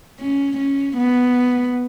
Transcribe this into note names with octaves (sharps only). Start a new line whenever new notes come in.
C#4
C#4
B3